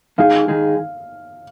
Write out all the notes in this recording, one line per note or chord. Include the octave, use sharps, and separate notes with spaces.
D#2 D#3 G#3 D#4 G#4 F5
D#2 D#3 G#3 D#4 G#4